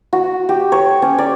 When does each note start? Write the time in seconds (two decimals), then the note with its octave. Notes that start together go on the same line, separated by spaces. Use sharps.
0.13 F#4
0.49 G4
0.72 C#5
1.02 C#4
1.18 D5